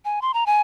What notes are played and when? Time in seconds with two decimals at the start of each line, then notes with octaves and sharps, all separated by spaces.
0.05 G#5
0.22 C6
0.34 A#5
0.46 G#5